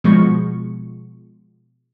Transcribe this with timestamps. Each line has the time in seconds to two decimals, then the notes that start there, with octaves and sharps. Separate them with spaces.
0.04 B2 F3 G#3 C#6